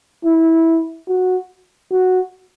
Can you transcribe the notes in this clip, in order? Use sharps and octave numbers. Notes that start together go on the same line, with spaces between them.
E4
F#4
F#4